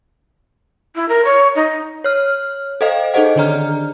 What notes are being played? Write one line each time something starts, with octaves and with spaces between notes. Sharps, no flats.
E4
A#4
C#5
D#4
C#5 F6
A4 C5 D#5 F5 G5
D#4 G#4 A4 C5 D#5 F#5
D3 D#3 D4 D5 A#5 F6